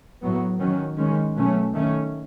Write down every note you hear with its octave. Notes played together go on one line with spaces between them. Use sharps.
A2 F#3 B3
D#3 F#3 C#4
D#3 G#3 C#4
B2 F#3 A3 C#4
D#3 A3 C#4